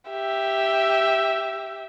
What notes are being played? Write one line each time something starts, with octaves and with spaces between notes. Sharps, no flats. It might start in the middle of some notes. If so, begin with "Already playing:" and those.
G4 E5